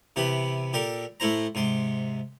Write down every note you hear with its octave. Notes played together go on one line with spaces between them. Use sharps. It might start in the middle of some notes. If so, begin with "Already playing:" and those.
C3 E3 B3 G4 B4
A#2 G4 A4 A#4
A2 A3 E4 C5 A#5
G#2 C3 C6